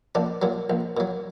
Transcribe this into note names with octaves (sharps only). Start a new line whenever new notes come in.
A#1 D4
A#2 F#3
A#1
A#2 F#3